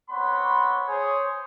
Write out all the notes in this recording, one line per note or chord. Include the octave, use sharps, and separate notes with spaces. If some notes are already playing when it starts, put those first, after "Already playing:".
B3 C4 C#5 F#5 B5 C6
G#4 C5 C#5